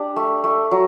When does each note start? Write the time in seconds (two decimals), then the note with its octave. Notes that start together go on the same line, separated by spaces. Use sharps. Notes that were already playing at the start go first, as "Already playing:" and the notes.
Already playing: D4 G4
0.16 A3
0.44 A3
0.71 F#3